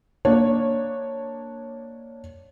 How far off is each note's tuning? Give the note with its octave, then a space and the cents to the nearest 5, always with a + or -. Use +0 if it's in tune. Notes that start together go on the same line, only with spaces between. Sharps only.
A#3 +0 D4 +0 C#5 -10